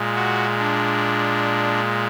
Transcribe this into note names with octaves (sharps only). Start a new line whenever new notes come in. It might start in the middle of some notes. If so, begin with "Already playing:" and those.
Already playing: A#2 G#3
F#4
D4